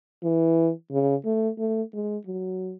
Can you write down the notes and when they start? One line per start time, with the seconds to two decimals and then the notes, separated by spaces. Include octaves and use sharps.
0.24 E3
0.91 C#3
1.25 A3
1.58 A3
1.94 G#3
2.27 F#3